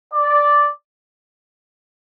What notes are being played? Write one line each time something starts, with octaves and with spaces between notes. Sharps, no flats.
D5